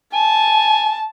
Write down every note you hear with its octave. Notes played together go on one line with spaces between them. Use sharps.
G#5 A5